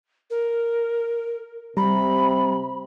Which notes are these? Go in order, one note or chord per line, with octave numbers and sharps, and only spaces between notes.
A#4
C3 G3 A#5 B5